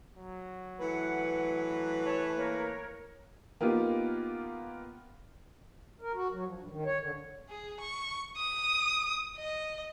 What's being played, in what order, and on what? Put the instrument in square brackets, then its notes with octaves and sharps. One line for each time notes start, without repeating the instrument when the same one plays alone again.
[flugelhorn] F#3
[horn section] E3 A3 B4 [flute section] F#5
[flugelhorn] C#5 [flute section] A5
[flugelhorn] A#3 [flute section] A#4 C#5
[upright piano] A#3 B3 D#4 F4 G4
[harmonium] A#4
F#4
F#3
F3
G2
D#3
C#5
D3
[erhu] G#4
C#6
D#6
D#5